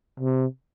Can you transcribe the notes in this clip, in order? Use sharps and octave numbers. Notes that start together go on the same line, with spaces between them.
C3